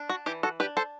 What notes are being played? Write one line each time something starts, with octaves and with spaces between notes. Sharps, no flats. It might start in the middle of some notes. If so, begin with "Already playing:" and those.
Already playing: D4
F#4
E3 E4 G4
F#4 A4
D4 G4 B4
A4 C5